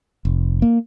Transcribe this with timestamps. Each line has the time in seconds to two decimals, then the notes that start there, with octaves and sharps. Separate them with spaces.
0.25 F1
0.62 A#3